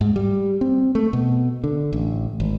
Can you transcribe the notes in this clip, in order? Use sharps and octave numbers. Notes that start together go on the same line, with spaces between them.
G#2
G3
C4
A3
B2
D3
A1
G#1